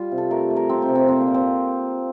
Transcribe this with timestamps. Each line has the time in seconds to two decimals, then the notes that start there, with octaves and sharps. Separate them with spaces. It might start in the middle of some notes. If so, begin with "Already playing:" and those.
Already playing: G3 F4
0.12 C3
0.18 A4
0.31 A3 A#4
0.50 A3
0.56 A#4
0.69 C3 C4
0.82 C4
0.89 C3
0.95 C4
1.08 A#2 C4
1.21 A#3
1.27 A#2
1.34 C4